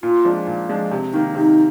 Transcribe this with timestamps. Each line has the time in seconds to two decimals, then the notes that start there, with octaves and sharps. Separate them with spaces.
0.03 A#2 F4
0.25 F3 G#3 D4
0.47 A#2
0.69 F3 G#3 D4
0.91 C3
1.13 D#3 A#3 D#4
1.35 C3 D#4